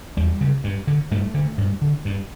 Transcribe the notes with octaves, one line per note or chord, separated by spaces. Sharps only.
E2 G3
C#3
G2
D3
G2 A3
D3
G2
D3
G2